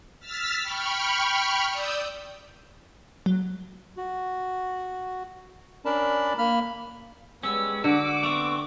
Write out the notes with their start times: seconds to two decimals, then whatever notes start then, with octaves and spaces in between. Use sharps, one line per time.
0.20 E6 F6 A6 B6
0.62 G5 B5 C#6 F6
1.68 D5 D#6 E6 G6
3.26 F#3
3.97 F#4
5.85 C#4 D4 A#4 D5 A5 B5
6.38 A#3 B5 F6
7.43 G3 G#3 B3 C#4 E6
7.84 D3 F#4 D6
8.23 A3 B3 C4 C#6